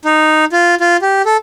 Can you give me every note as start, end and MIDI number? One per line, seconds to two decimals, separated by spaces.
0.05 0.45 63
0.52 0.75 65
0.80 0.97 65
1.02 1.22 67
1.25 1.37 69